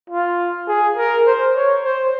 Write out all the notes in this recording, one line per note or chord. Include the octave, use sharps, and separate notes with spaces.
F4
G#4
A#4
C5
C#5
C5